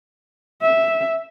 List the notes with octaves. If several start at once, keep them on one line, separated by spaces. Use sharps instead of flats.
E5